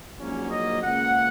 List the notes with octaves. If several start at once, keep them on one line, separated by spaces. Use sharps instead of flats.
A#1 G#2 F#3 A#3 C#4
D#5
C#2 C#3 A#3 F#5